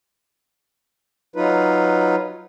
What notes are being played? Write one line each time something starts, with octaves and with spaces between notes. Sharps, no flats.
F#3 D#4 F4 B4